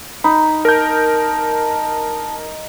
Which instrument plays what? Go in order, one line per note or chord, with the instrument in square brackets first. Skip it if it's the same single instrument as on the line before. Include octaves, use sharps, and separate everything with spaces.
[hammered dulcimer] D#4 [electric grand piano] B5
[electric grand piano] A#4 G6 [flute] A5